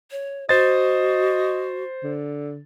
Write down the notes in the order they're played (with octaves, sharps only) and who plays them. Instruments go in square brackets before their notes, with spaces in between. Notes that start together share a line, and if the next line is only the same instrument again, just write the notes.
[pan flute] C#5
[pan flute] F#4 [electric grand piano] C5 A6 [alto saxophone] D#5
[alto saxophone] D3